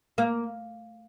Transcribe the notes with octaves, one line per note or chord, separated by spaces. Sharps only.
A#3